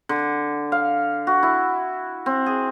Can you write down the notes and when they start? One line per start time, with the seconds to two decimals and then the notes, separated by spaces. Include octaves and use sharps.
0.09 D3
0.72 F5
1.27 F#4
1.43 E4
2.26 C4
2.46 G#4